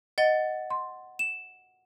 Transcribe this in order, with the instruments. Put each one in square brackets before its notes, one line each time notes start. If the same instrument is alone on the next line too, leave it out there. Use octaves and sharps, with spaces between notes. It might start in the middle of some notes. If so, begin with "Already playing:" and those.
[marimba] D#5 [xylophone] F#5 A6 G7
[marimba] C6
[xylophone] E7